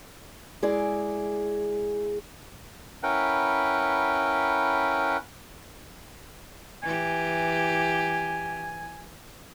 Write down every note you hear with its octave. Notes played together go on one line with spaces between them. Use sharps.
G#3 E4 G#4 D5
C#4 E4 A#4 B4 F#5 G5
E3 G4 G#5